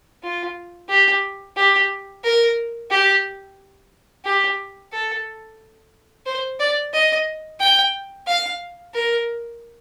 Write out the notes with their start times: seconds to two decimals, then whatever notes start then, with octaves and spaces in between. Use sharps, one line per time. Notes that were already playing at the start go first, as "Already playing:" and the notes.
0.23 F4
0.89 G4
1.57 G4
2.24 A#4
2.91 G4
4.25 G4
4.93 A4
6.26 C5
6.60 D5
6.94 D#5
7.60 G5
8.27 F5
8.94 A#4